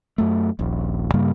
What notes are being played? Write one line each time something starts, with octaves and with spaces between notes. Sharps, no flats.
F#2 A3
D#1 A#1
G2 C#3 G3 A#3